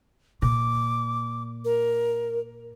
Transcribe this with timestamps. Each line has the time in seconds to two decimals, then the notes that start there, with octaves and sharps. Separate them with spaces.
0.42 A#2 D6
1.65 A#4